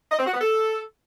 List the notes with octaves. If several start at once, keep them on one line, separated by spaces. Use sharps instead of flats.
D#5
C4
F#4
B3
A4